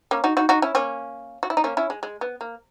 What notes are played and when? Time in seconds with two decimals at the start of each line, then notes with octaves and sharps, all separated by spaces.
0.11 A#3 C#4
0.24 D#4 F#4
0.37 D#4 F#4
0.49 D#4 F#4
0.62 C#4 E4
0.75 A#3 C#4
1.43 F#4
1.50 E4
1.57 D#4
1.64 A#3 C#4
1.77 C#4 E4
1.90 G#3
2.03 G#3
2.21 B3
2.41 A#3